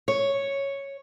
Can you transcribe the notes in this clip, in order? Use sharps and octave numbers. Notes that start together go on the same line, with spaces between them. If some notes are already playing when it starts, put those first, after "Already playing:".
C#5